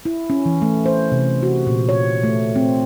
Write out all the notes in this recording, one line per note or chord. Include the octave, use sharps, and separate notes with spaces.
E4
C#4
E3
A3
C5
C3
F#4
A#2
C#5
A3
C4